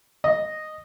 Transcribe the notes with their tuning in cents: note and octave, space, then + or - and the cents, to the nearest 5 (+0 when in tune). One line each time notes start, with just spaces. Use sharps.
D#5 -5